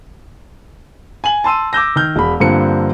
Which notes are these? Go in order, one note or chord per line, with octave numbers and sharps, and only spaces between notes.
G#5 F#7
A5 C6 E6 D#7
D6 E6 G6 A#6
D#3 F6 G6
E1 B5
G2 D3 F3 A#3 C4 C#7